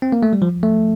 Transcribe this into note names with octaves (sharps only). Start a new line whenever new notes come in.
C4
A#3
A3
G3
F3
A3